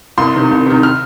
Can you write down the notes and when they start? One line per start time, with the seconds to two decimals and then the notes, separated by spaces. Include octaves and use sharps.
0.17 C2 C6
0.35 C3 D#3
0.51 C2
0.66 C3 D#3
0.83 F6